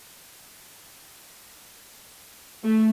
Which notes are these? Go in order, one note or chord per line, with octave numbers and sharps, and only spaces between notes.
A3